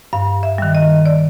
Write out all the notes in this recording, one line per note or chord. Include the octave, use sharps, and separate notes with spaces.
G2 F5
E5
D#3 G3
D#5
D5